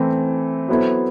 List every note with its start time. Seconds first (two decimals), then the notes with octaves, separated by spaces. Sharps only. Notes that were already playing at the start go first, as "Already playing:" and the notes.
Already playing: E3 A3 C4
0.68 F#3 B3 E4 A4 C5